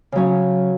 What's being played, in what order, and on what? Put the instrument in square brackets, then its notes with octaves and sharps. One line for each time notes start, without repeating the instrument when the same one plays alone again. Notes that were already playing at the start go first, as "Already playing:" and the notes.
[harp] C#3 F#3 C#4